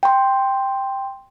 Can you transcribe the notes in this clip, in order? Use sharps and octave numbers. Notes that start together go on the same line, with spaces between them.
G5 C6